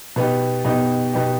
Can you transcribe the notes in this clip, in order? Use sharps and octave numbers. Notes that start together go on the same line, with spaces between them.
B2 B3 D#4 G4
B2 B3 D#4 G4
B2 B3 D#4 G4